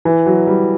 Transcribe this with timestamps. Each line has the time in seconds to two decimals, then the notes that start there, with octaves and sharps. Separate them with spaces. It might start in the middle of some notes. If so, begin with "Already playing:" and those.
0.05 E3
0.26 F#3
0.47 G3